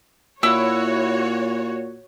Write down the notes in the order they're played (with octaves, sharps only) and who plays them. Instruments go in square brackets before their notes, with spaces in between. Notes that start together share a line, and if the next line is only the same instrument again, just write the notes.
[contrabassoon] A#2 [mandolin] E4 E6 [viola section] F#4 C#5